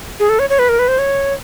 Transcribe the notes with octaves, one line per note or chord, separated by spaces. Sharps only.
G#4
A4
C#5
C#5
B4
A#4
B4
C5
C#5